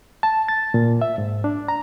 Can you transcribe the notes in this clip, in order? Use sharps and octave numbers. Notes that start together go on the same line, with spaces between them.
A5
A6
A#2
E5
G#2
D4
A#5